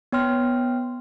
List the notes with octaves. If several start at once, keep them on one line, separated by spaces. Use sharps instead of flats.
B3 C#5 G5 C6 F6